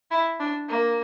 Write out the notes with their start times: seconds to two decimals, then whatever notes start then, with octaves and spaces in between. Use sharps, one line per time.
0.11 E4
0.40 D4
0.69 A#3